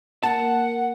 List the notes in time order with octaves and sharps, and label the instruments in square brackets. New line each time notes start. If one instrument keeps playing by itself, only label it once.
[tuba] A#3 [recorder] F#5 [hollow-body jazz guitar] A5